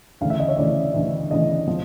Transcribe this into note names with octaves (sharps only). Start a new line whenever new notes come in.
D2 C#3 E3 F5
E5
D#5
C#5
D2 C#3 E3 D5
D2 C#3 E3
D2 C#3 E3 D#5
C3 F3